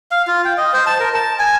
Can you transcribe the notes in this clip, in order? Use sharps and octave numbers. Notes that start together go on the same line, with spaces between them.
F5
F4
G5
D#5
C5
A5
A#4
A5
G#5